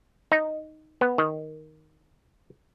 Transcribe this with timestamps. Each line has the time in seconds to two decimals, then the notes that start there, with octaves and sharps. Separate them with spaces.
0.32 D#4
1.01 B3
1.18 D#3